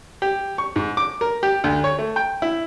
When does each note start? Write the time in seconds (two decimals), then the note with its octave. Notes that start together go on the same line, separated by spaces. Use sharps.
0.22 G4
0.58 C#6
0.76 G#2
0.97 D6
1.21 A#4
1.43 G4
1.64 D2
1.84 C#5
1.99 A3
2.16 G5
2.42 E4